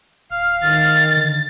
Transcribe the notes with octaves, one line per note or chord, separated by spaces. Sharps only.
D1 F5
D#3 A6
D3